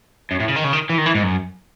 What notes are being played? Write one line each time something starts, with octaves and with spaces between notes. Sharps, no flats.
F#2
A2
C#3
D#3
C#3
D#3
E3
D#3
E3
G#2
F#2